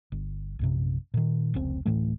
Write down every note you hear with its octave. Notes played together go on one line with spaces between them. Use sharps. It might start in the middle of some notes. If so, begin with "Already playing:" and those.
G1
A#1 F#2 C3
A#2 D#3
F1 C#2 C4
D1 A2 E3 A3